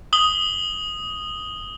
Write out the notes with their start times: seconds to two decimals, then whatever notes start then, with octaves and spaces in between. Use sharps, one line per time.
0.13 D#6 F#7 G7